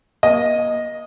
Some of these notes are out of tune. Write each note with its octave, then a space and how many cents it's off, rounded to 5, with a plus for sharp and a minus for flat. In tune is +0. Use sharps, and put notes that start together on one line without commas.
A#3 +35 D#5 +0